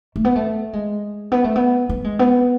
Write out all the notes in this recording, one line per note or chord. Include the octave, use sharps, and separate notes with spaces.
A3
B3
A3
G#3
B3
A3
B3
B3
G#3
B3